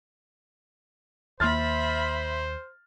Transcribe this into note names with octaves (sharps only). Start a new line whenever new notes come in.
D#2 A#3 C5 E5 B5 C6 F6 A6